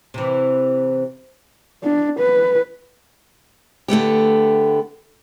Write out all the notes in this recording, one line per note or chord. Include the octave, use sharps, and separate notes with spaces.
C3 E3
D4
B4
D3 A3 B3 G4